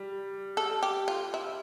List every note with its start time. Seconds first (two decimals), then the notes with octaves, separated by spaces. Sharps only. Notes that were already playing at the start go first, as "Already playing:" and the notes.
Already playing: G3
0.57 A4
0.83 G4
1.08 F4
1.34 E4